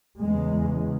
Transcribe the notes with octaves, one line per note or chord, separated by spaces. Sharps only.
E2 C#3 G#3